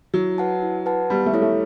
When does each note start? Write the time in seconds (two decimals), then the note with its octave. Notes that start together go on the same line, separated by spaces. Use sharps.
0.14 F#3 E4
0.38 B4 F#5 A5
0.63 E4
0.86 B4 F#5 A5
1.10 G3 B3
1.26 A3
1.34 E4 A4 C#5
1.42 A3